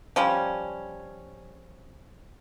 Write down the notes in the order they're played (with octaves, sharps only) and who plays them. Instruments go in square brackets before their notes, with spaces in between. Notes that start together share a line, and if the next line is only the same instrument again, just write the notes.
[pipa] F3 G3 C#4